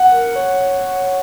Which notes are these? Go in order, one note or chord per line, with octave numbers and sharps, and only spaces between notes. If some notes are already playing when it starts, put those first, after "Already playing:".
Already playing: F#5
A#4
C#5